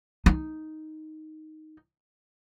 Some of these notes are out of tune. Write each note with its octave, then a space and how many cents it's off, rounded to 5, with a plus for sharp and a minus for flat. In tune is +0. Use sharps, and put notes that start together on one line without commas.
D#4 +5